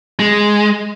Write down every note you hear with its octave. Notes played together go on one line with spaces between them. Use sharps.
G#3